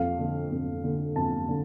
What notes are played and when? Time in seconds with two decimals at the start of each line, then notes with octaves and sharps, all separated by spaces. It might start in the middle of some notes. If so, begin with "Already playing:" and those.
Already playing: F2 F5
0.19 D3
0.52 F2
0.84 D3
1.16 F2 A5
1.48 D3